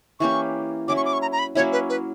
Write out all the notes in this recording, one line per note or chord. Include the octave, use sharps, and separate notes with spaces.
E3 A#3 C#4 G4 C#6
F#3 C#4 E4 D6
C#6
D6
C#6
A#5
A#5
B5
F#3 A#3 C#4 E4 C#5
B4
B4